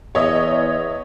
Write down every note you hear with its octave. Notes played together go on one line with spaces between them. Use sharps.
E2 C#5 D#5 E5